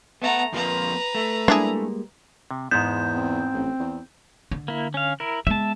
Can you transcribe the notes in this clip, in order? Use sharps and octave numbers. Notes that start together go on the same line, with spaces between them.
A3 B3 E5 F#5 A#5
F2 F3 A#3 B4 A#5
A3
G3 G#3 A#3 D4 E4 G#4
C3
E2 G#2 G#3 B3 G6
C4
A1
E2
D3
A#3 E4
C#4 F5
E4 A#4
G#3 B3 E5 A5